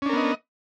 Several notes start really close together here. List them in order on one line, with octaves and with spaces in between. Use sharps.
C#4 D4 A#4 B3 D#5